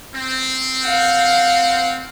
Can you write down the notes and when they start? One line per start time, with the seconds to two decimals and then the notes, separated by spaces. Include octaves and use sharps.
0.15 C4
0.84 F5 F#5